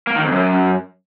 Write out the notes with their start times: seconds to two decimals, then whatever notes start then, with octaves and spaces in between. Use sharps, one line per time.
0.07 A#3
0.15 D#3
0.24 F2
0.32 F#2